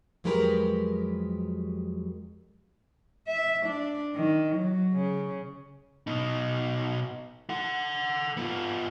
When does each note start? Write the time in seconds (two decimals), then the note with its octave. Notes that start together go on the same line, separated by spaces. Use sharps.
0.24 F2 F#3 G#3 G4 A#4 B4
3.27 E5
3.66 D4
4.15 D#3
4.55 F#3
4.93 C#3
6.07 B2 D#4
7.50 A4 F#5
8.37 B3 F4